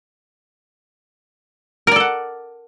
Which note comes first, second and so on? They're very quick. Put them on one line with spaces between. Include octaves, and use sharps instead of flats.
A#4 D5 A4 F#5